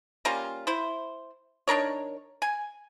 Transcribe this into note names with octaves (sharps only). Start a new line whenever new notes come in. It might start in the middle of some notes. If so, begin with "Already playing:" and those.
G3 A#3 C#4 F4
E4 C5
D#3 D4 A#4 C#5
G#5